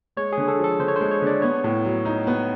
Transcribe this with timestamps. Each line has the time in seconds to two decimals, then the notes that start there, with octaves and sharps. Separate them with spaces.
0.17 G#3 C#5
0.33 D3 G#4
0.48 A4
0.59 F3
0.64 A4
0.79 D3 C5
0.88 C#5
0.96 G#3 C5
1.11 C#5
1.22 D3 D5
1.42 B3 C#5
1.64 A2
1.85 F#3
2.05 D#4
2.27 B3